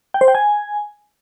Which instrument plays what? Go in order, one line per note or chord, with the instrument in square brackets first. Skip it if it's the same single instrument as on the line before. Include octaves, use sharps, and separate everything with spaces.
[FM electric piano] G5
C5
G5
G#5